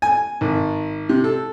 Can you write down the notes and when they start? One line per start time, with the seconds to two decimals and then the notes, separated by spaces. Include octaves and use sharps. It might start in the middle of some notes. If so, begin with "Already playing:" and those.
0.02 G#5
0.41 G#1
1.09 C3
1.24 A4